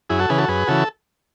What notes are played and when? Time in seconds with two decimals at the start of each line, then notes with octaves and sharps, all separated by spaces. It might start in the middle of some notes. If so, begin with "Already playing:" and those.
0.10 F#2 E4 G#4
0.19 F#4 A4
0.29 C#3 E3 G#4 B4
0.38 F#4 A4
0.48 F#2 G#4 B4
0.67 C#3 E3 F#4 A4